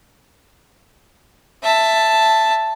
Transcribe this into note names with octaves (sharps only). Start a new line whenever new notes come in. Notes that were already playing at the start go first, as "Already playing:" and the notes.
E5 A5